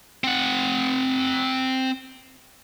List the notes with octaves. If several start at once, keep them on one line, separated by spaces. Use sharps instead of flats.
C4 F#5